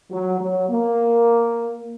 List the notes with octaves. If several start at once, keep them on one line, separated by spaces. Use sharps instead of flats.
F#3
F#3
A#3